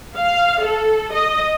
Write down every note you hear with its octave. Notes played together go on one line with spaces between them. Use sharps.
F5
A4
D#5